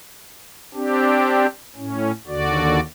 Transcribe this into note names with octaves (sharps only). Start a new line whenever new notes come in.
C4 D4 G4
A2 C#4
D#2 D3 F#4 D5